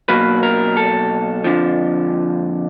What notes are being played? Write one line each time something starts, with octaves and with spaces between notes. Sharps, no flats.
B2 F#3 A#3 B4
A#4
A4
F2 D3 F3